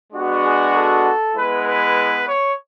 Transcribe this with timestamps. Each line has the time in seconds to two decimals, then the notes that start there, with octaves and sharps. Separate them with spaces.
0.13 G#3 B3 D4 F#4
0.45 G#4
0.75 A4
1.35 G#3 B3 E4 B4
1.66 B4
2.26 C#5